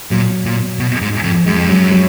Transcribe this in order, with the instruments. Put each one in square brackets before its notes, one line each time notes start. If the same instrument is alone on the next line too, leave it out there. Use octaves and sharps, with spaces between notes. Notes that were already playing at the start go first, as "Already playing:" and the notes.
[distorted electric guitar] A#2 [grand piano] F#3
[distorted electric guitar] A#2
B2
G#2
F2
[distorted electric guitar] F#2 [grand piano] G#3
[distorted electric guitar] F2
[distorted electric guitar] F#2 [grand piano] F#3
[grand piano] F#3